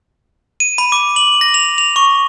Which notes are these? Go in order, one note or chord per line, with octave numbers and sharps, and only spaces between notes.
D#7
B5
D6
F#7
A#6
F7
F7
C#6